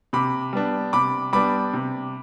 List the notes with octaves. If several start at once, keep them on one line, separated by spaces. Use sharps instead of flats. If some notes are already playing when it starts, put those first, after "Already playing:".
C3 B5 D6
G3 B3 D4
C3 B5 D6
G3 B3 D4 B5 D6
C3